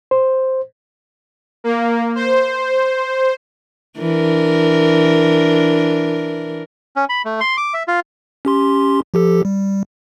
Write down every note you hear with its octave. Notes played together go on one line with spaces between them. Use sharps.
C5
A#3
C5
E3 D4 A#4
C#4
B5
A3
C6
D6
E5
F4
C#4 G4 C6
F3 G4 A4
G3